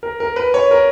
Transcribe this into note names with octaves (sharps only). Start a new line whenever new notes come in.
A#4
A#4
B4
C#5
A#4